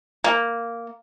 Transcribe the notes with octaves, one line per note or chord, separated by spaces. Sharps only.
A#3